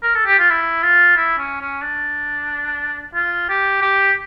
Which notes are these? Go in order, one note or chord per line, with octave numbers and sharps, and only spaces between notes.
A#4
A4
G4
F4
E4
F4
E4
C#4
C#4
D4
F4
G4
G4